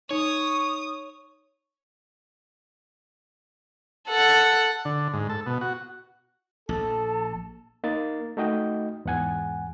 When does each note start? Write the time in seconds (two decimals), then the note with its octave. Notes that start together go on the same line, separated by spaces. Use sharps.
0.11 D#4 C#5 C#6 D#6
4.08 A4 F#5
4.85 D3
5.14 G#2
5.30 A4
5.46 B2
5.61 F#4
6.69 A#1 A4 A5
7.84 A#3 D#4 A6
8.37 A3 D#4 F#4 D#5 G5
9.05 E2 G#2 F#5 G#5